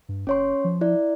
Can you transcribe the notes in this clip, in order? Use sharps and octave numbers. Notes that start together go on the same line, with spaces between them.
G2
F#1 C#4 C#5 C6
F3
E4 D5